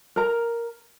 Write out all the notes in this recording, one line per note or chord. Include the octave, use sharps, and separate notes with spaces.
A#4 A#5